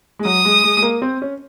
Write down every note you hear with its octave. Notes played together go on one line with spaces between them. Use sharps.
G#3
F#3 D#6
G#3
G#3
G#3
A#3
C4
C#4